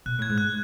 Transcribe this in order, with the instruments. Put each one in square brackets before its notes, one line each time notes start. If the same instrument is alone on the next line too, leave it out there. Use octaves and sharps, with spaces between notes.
[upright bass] B2 [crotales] F#6
[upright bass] A2 [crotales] G#6
[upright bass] G#2
[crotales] F#6